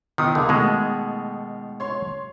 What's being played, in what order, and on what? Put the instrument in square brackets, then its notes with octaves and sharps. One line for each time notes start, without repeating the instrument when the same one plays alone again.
[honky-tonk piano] B2 D#4 D#6 [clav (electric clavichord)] D#3
[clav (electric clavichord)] D3 [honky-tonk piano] A#3 G#4
[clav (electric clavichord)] B2 G#3 [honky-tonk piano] D#3 A3
[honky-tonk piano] C#5 C6